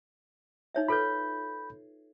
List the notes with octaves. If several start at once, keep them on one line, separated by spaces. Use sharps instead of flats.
D#4 C#5 E5
F4 A4 B4 B5 G6